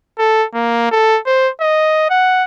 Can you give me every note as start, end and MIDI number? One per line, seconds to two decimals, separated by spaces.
0.19 0.45 69
0.54 0.89 58
0.92 1.19 69
1.26 1.49 72
1.61 2.07 75
2.10 2.44 78